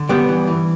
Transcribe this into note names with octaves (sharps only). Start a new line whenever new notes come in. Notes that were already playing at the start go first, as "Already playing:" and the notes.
Already playing: D3
G2 G3 B3
E3
E3